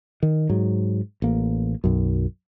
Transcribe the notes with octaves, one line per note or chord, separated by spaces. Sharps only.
D#3
G#2 F#3
A1 A#3
B1 F#2